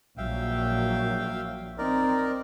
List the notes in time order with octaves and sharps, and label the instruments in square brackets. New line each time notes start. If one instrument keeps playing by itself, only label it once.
[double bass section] A#1 A#2 F#3 [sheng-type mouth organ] E5 F5 G5
[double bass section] C4 [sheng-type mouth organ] D#4 A#4 D5